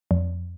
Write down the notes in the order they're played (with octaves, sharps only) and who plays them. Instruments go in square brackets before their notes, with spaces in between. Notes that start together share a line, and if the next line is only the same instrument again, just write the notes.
[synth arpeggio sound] F2